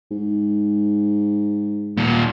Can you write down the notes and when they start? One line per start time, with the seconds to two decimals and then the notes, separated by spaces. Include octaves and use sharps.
0.11 G#2
1.97 D#2 A#2